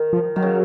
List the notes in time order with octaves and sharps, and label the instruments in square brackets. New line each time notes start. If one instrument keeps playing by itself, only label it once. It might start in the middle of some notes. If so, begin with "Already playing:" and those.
Already playing: [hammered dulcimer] D#3
[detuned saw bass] F3
[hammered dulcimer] D#3 [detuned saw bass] F#3
[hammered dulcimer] C#3